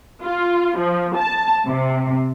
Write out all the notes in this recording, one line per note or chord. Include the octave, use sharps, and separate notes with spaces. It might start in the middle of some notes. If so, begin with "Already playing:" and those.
F4
F3
A5
C3